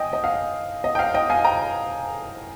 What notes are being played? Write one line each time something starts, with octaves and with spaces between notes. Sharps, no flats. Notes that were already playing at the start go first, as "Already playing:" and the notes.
Already playing: D#5 G5 G#5
D#5
F5
D#5
G5
F5
D#5 G5
F5 G#5
G5 A#5